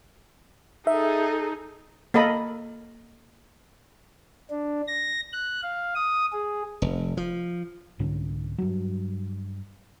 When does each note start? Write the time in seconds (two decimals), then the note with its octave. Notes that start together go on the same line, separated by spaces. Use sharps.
0.87 D#4 G#4 A4 E5
2.14 A#3 A4 D#5 B5
4.50 D4
4.88 A#6
5.33 F#6
5.63 F5
5.95 D#6
6.32 G#4
6.82 F1
7.17 F3
7.99 C2 G#2 D3 C#4
8.58 G2 F#3